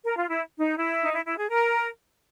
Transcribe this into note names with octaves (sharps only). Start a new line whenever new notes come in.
A#4
F4
E4
D#4
E4
D#4
E4
E4
G#4
A#4